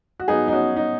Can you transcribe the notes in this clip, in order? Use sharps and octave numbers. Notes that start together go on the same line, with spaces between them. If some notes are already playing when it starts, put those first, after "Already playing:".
F#4
G#2 F#3 B3 D#4 G#4
D#4
C#4 F#4
D#4